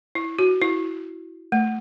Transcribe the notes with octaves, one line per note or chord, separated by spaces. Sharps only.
E4
F#4
E4
A3